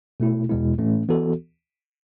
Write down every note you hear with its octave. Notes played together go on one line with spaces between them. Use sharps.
B2 A3 E4
E2 B2 G#3 B3 E4
A2 E3 A3 C#4
E3 B3 F#4 A4